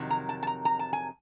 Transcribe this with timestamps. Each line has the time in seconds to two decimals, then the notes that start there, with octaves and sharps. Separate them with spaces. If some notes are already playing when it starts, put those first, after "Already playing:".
Already playing: F2 C3 D#3 F#3
0.10 A#5
0.29 A5
0.43 A5
0.47 A#5
0.65 A#5
0.79 A5
0.93 G#5